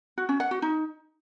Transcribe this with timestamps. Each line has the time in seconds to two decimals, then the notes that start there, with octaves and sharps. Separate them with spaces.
0.18 F#4
0.29 C#4
0.40 F#5
0.51 F#4
0.62 D#4